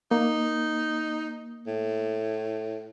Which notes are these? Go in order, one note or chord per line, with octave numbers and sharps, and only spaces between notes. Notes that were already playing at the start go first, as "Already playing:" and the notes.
A#3 D#4
A2